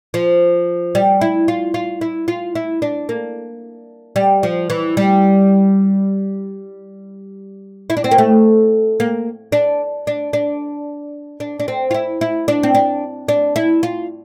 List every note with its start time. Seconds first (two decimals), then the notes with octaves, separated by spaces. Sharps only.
0.14 F3
0.95 G3
1.21 E4
1.48 F4
1.74 F4
2.01 E4
2.28 F4
2.55 E4
2.82 D4
3.09 A#3
4.16 G3
4.43 F3
4.70 E3
4.97 G3
7.90 E4
7.97 D4
8.04 C4
8.11 A#3
8.18 A3
9.00 A#3
9.52 D4
10.07 D4
10.33 D4
11.40 D4
11.60 D4
11.68 C4
11.91 F4
11.94 E4
12.21 E4
12.48 D4
12.63 C4
12.75 D4
13.28 D4
13.56 E4
13.83 F4